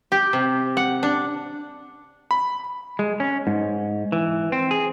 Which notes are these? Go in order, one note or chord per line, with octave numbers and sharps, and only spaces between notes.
G4
C3
F#5
D4
B5
G#3
C#4
G#2
E3
C4
G#4